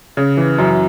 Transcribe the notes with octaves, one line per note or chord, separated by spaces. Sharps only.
C#3
E3
F#2